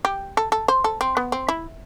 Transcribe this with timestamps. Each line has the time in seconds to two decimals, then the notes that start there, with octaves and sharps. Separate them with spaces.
0.05 G4
0.37 A4
0.52 A4
0.68 C5
0.84 A4
1.01 C4
1.17 B3
1.32 C4
1.49 E4